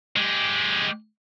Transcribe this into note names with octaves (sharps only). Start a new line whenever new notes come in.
G#3 G4